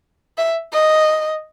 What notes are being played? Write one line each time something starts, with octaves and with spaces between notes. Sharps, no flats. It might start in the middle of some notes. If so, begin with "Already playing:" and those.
E5
D#5